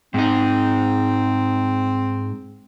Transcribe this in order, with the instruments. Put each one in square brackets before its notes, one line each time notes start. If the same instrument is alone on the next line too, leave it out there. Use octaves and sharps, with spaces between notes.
[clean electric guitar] G#2 D#4 [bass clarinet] C4